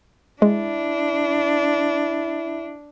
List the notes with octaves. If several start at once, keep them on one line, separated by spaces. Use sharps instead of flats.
G#3 D4 E4